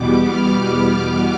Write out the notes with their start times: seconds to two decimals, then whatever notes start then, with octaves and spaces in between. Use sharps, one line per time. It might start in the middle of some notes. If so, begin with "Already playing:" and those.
Already playing: E2 B2 G3 B3 D6
0.23 F6
0.56 F6